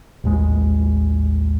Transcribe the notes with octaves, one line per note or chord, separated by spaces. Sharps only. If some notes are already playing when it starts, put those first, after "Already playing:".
A1 D#2 G#3